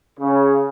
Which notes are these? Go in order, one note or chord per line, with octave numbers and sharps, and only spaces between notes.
C#3